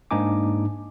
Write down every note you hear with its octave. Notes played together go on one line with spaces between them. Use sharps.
G#2 A#3 D4 D#4 G#5 D6